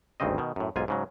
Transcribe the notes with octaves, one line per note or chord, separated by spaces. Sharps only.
G#1 D2 G2 C#3 C4 D#5
B2 D#3
F#2 A2
B1 G#2 F4 G#5
G#2 C#3 F#3